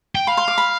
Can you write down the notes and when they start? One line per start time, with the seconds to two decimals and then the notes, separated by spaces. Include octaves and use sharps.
0.15 G5
0.27 F5 B5
0.37 C6
0.48 D6
0.58 B5